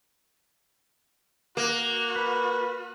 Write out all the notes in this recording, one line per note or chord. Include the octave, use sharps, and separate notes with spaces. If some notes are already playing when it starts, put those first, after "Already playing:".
A#3 F#4
B4